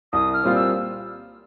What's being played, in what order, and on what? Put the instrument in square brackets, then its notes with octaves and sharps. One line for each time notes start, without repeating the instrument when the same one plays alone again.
[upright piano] C2 [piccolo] D#6
[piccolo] F6
[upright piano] A#2 G3 C4 F4
[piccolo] E6